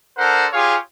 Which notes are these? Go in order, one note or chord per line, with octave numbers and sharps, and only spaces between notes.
D4 A4 A#4 C5 F#5
F4 G4 G#4 C#5 F5